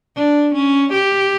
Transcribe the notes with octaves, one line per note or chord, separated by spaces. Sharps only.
D4
C#4
G4